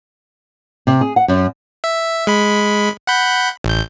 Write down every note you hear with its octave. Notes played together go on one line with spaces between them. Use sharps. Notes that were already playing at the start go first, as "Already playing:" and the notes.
C3
G#4
F#5
F#2
E5
G#3 B5
F#5 B5 G6
A1 G6